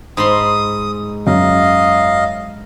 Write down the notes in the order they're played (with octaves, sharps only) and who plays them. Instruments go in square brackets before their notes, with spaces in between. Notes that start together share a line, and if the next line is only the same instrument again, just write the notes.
[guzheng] G#2 B5 C6 [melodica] D#6
[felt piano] F#2 [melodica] D#5 F5